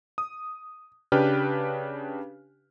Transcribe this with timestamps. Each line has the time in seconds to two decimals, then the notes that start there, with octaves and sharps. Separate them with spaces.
0.18 D#6
1.12 C#3 D4 G4 B4 G5 F6